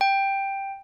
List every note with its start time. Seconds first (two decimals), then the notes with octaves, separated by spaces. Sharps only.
0.01 G5